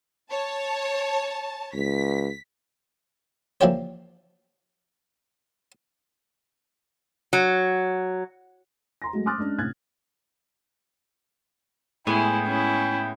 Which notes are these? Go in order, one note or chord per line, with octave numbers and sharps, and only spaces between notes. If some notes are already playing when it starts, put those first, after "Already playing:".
C#5 A5
C#2 B6
E3 F3 A#3 D4 G4 C#5
F#3
A#5 C6 A#6
F#3 G#3 A3
C6 D6 D#6 F6 F#6 A6
G#3 C#4 D4
A2 C3 F#6 G#6 A6
A2 G#3 B3 E4 G5 G#5
C#4 E4